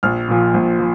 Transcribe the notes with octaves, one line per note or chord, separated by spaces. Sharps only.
A#1 F6
A#2 F3
A#1
F3